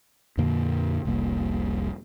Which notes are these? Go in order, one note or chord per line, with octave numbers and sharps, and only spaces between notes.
F2 A#2 D3 A#3
F1 C2 A#3